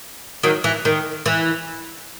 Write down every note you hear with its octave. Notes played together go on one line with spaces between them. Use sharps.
D#3 F#3
E3
D#3
E3